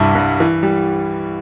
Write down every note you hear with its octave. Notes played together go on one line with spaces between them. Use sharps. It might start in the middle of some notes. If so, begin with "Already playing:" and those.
Already playing: C2 G2 E4
G2
E3
G3